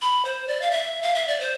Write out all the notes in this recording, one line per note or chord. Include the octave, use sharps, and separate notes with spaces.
B5
C5
D5
F5
E5
F5
E5
D5
C5